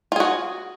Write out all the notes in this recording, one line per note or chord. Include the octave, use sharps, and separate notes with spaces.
F4 F#4 G#4